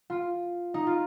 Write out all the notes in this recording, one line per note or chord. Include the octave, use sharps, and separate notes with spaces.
F4
D#4
F4